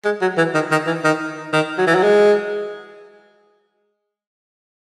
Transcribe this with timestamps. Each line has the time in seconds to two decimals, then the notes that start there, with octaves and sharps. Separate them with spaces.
0.05 G#3
0.21 F#3
0.37 E3
0.54 D#3
0.71 D#3
0.87 E3
1.04 D#3
1.53 D#3
1.78 F#3
1.87 E3
1.95 F#3
2.03 G#3